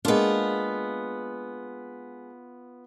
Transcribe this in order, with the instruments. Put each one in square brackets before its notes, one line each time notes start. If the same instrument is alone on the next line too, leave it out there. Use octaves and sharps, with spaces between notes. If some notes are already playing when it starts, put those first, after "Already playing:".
[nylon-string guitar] G#3 A#3 D4 [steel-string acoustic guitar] B3 F4